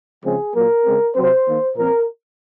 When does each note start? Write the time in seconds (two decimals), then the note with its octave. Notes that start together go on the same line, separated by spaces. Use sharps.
0.24 C#3 F3 G#3 C4 G#4
0.55 A#2 F#3 A#3 A#4
0.85 C#3 G#3 C4
1.15 C3 F#3 C4 C5
1.46 D#3 A#3
1.76 A#2 F3 C4 A#4